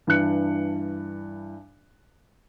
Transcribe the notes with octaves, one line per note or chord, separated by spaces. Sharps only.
G2 E3 D4 F#6 C#7